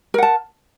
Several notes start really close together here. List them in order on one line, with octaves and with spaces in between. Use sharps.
A#4 F#5 A5